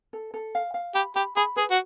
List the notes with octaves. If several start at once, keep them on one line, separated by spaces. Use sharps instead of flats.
A4
A4
F5
F5
G4 B5
G4 B5
G#4 B5
G#4 B4
F#4